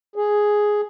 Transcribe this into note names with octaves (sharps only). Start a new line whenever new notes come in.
G#4